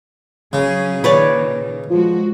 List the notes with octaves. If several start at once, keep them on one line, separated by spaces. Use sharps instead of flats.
C#3 F#3 C#4 G#4
A#2 D#3 B4 C#5 D5
F3 G#3 F#4